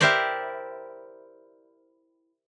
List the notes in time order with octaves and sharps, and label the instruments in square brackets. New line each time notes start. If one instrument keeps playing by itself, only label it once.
[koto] E4 G4 A#4 C5 D5